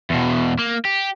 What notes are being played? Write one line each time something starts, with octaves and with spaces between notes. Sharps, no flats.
E2 B2
A#3
G4